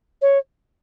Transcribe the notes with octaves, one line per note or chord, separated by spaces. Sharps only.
C#5